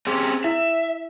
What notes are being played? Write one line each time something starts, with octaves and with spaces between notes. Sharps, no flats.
C4 C#4 G4 G#4
E4 E5